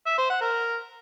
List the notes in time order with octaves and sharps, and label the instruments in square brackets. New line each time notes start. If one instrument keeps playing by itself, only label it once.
[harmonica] E5
C5
F#5
A#4